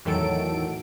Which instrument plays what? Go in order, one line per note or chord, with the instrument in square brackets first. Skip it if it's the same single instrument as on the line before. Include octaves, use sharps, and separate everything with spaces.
[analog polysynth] E2 A2 D#3 F#3 A4 D7